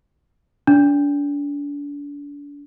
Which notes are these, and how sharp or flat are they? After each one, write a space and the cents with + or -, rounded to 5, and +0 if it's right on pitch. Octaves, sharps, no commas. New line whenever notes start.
D4 -35